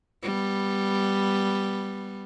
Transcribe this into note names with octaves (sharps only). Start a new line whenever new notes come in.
G3 B3